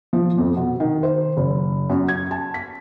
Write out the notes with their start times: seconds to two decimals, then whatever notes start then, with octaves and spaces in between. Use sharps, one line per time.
0.13 F3
0.38 F2
0.56 B2
0.80 D#3
1.03 C5
1.37 F#1
1.90 F#2
2.08 G#6
2.31 A5
2.54 B6